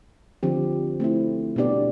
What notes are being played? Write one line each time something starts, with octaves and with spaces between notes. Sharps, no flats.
D3 F3 C4 G4
A3 C4 E4
B2 B3 D4 G4 D5